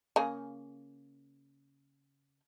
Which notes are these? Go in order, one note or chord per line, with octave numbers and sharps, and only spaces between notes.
C#3 A#3 G#4